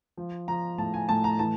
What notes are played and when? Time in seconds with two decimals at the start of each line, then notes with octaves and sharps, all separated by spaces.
0.17 F3
0.48 F3 A#5
0.78 A2 A5
0.94 G#5
1.09 A2 A5
1.24 A#5
1.39 E3 A5